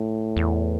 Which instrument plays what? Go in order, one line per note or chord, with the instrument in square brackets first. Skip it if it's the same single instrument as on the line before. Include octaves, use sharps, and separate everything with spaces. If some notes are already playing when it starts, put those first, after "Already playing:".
Already playing: [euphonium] A2
[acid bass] E2